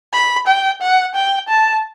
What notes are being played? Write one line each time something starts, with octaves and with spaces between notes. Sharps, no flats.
B5
G5
F#5
G5
A5